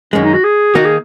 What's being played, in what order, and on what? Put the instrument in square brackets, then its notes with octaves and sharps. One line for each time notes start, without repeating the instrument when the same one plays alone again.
[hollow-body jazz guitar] F#2 D#3 G#3 [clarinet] C#4
[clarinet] D#4
F#4
G#4
[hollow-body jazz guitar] D#3 A#3 D#4 [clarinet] F#4
[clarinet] G#4